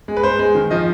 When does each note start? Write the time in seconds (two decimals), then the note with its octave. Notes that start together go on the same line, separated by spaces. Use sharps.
0.08 G#3
0.17 B4
0.23 G#3 C5
0.39 G#3
0.55 D#3
0.71 F3 D#5